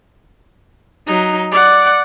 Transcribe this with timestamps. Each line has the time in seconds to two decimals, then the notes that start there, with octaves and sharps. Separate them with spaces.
1.07 F#3 D#4
1.51 D5 F#5